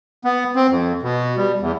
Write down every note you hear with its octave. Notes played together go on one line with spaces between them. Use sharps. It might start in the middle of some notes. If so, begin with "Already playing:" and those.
B3
C4
F2
B2
G3
E2